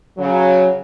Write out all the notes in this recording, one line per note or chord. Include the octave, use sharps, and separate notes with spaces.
C#3 F#3